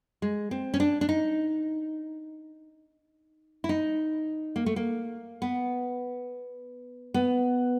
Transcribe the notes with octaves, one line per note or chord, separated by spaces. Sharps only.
G#3
C4
C#4
D4
D4
D#4
E4
D#4
A#3
A3
A#3
B3
B3